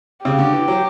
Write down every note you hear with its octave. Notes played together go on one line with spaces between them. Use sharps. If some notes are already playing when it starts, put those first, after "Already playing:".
C#3 G4
D3
E3
F#3